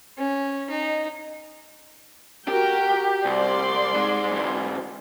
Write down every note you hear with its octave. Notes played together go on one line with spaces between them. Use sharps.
C#4
D#4
F#4 G4 A#4 G5
C2 D5 C6
G#2 G#3
G#2 E3